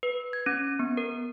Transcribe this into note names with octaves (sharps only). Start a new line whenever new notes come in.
B4
G#6
C#4
B3
A#4